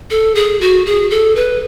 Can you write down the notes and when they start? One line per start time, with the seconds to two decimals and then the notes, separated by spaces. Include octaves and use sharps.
0.10 A4
0.35 G#4
0.61 F#4
0.86 G#4
1.11 A4
1.36 B4